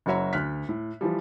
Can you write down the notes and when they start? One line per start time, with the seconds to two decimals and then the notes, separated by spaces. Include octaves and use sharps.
0.06 F#1 F#3 F#4 C#5 E5 A#5
0.33 D2 F6 F#6 B6
0.69 A2
1.01 E3 F3 G3